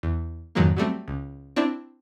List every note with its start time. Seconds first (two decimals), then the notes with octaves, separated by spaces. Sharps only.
0.03 E2
0.55 F2 G#2 D#3 F#3 G#3 A#3
0.77 F#3 G3 A3 C4
1.08 C#2
1.56 C4 D4 E4 D5